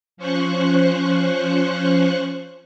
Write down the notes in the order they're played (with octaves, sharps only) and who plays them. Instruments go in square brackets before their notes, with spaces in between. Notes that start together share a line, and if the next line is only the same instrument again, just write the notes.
[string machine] F3 C#4 C5 C#6 F#6